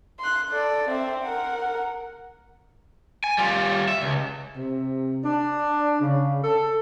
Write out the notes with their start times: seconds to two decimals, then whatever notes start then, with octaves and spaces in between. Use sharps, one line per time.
0.20 C6 F#6
0.51 A4 D5
0.89 C4 E5
1.23 A#4 F#5
3.24 G#5
3.38 G3 F4
3.88 E5
4.01 C#2
4.57 C3
5.25 D4
6.02 C#3
6.44 A4